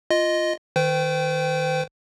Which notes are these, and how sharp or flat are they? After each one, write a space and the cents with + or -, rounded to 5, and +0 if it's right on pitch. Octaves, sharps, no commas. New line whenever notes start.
F4 -5 D#5 +0
D#3 +0 C5 -40 G5 -5